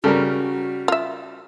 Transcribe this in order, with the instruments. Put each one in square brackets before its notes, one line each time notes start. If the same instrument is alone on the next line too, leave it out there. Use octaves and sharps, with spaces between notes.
[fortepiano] C#3 G3 A#4 [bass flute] F#4 [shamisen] A4
[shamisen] F4 E5